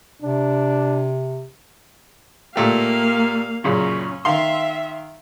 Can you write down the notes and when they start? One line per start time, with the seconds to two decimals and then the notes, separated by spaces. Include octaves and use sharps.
0.22 C3 D4
2.56 A#2 A3 A#3 G4 F5
3.64 F#2 A#2 C#3 C#4
4.25 D#3 E5 F5 C6